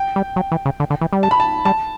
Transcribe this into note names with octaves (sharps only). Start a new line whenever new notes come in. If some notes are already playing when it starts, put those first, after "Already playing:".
Already playing: G5
G3
F#3
E3
C#3
D3
D3
E3
G3
A5
B5
A5
G3 A5